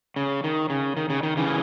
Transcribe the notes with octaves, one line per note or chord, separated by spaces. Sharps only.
C#3
D#3
C#3
D#3
C#3
D#3
C#3 E3